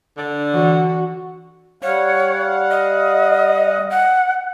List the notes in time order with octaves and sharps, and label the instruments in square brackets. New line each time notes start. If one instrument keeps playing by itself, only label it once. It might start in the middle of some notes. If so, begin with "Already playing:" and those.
[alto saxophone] D3 [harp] D4 D5
[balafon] E3 [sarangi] F#4
[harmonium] G3 F5 F#5 [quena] C#5
[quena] D#5
F#5